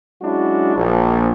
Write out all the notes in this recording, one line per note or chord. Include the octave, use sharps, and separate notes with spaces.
F#3 G#3 C#4 D4 E4 F#4
A#1